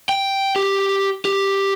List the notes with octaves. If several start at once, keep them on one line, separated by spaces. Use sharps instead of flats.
G5
G4
G4